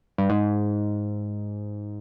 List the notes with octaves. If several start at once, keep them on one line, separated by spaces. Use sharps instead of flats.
G2
G#2